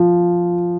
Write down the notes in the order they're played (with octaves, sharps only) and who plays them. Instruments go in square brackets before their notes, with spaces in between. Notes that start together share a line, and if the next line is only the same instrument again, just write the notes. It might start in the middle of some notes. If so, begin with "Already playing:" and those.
Already playing: [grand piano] F3